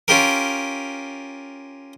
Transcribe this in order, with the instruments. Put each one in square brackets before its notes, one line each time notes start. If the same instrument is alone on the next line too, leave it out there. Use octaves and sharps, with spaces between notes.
[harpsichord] C#4 F4 G4 A#4